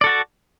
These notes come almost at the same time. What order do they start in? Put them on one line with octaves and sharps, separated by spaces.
D5 A4 F#4 A5